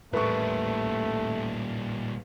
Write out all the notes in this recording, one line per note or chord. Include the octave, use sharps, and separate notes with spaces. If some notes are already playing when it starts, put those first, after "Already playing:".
A1 A#2 G3 A3 A#4 B4 C6 C#6